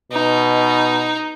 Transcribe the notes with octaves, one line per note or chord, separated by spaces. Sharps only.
B2 D#4